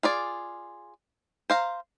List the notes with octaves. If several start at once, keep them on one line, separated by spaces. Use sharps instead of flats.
F4 G#4 D5
C5 F5 A#5